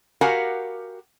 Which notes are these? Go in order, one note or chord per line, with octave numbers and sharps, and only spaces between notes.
F#4 G4 A#4 F5 F#5 G#5